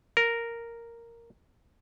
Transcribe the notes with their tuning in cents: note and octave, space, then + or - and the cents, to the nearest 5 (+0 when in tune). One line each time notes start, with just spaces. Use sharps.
A#4 -5